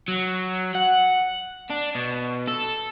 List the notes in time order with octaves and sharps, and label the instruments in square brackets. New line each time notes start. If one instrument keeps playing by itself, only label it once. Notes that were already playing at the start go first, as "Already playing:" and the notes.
[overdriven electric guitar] F#3
F#5
D4
B2
A4